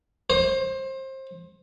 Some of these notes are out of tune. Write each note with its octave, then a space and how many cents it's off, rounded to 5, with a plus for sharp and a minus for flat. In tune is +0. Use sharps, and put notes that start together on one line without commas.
C5 +25